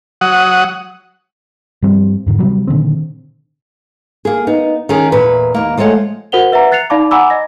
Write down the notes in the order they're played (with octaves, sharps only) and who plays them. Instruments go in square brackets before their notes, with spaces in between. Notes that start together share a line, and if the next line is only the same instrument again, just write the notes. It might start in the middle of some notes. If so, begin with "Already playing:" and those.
[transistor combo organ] F#3 F#5 D#6
[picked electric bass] G2 F3 G3 C4
E2 G#2 D3
C3 F#3 G3
A#2 D3 D#3 C4
[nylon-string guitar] A#3 G#4
B3 D#4
D#3 C#4 G#4
E2 A#2 B4
D#2 A#3
F3 G#3 A3 C#5 F#5
[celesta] F#4 A#4 C5 F#5 F7 G7
B4 E5 F#5 A#5
F#6 A6 C7 C#7 F7
D#4 D5 F5 A5 B5 D6
F#5 G#5 A#5 B5 D6 E6
D#5 A#6